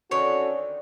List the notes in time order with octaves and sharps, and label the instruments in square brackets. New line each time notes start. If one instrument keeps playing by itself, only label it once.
[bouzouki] D3 D#3 C4 [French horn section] C#4 F#4 A4 [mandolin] C#5